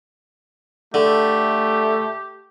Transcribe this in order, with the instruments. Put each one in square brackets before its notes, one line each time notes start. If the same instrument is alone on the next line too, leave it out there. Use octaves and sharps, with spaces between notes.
[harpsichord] D3 [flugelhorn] A3 [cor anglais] G4